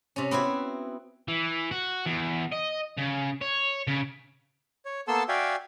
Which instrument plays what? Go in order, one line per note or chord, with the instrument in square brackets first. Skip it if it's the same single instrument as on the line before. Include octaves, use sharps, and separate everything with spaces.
[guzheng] C3 C#4
B3 C4 E4 F#4
[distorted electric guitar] E3
F#4
E2
D#5
C#3
C#5
C#3
[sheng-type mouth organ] C#5
A#3 B3 A4 A5 C6 E6
F#4 D5 E5 F5 G5 G#5